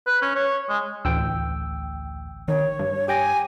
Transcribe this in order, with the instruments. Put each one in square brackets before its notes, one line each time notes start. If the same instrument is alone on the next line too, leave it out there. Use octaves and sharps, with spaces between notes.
[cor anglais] B4
C#4
C#5
G#3
[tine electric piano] A1 G5 E6 [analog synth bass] D2
[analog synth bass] D#3 [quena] C#5
[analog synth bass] G2
[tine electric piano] G4 G5 A#6 [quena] G#5